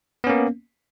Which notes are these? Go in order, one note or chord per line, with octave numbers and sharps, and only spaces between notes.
A#3 B3 C#4